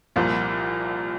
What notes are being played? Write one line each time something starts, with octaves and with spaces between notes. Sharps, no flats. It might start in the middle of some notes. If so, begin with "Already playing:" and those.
C2 A#2 F3 A#3